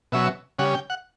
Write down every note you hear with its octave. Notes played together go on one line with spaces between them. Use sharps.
B2 F#3 C#4 E5
C#3 G3 C#4 F#5
G5
F#5